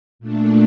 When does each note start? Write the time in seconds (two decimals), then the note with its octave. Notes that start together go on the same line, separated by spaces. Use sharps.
0.19 A#2 A3 D4